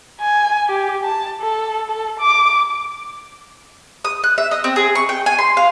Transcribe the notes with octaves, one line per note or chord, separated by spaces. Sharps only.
G#5
G4
A5
A4
A4
D6
D#6
F#6
E5
D#5
C4
G#4
C#6
G5
G#5
C6
F5